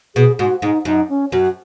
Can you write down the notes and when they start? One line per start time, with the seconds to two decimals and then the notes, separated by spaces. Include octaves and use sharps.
0.16 B2 G#4
0.39 G#2 F#4
0.62 G#2 D#4
0.85 F#2 D#4
1.09 C#4
1.32 F#2 F#4